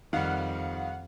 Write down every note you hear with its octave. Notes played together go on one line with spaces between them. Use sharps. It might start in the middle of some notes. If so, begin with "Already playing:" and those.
F2 D#3 G3 F5 F#5